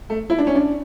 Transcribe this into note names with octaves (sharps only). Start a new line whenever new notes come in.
A3
E4
D4
C#4
D4